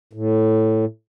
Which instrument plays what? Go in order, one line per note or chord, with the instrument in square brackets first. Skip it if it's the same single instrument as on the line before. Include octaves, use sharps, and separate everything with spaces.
[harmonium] A2